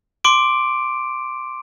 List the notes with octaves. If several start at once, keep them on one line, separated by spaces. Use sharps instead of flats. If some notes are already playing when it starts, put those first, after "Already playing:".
C6 D6 D7